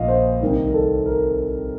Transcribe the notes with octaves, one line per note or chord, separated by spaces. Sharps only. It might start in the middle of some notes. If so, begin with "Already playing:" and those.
Already playing: A#1 A#2 F3 D#5 F5
C5
C2 C3 D#3 G3 A#4
A#4
A4
A#4